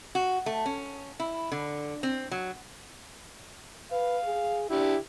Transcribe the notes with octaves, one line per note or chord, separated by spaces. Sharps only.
F#4
A3
C#4
E4
D3
C4
F#3
B4 F5
G#4
D4 E4 G4